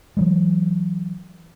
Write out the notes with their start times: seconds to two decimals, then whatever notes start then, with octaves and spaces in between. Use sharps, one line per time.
0.17 E3 F#3 G#3